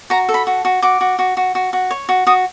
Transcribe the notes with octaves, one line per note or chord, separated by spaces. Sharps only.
F#4 A#5
A4
B5
F#4
F#4
F#4 D6
F#4
F#4
F#4
F#4
F#4
C#5
F#4
F#4 D#6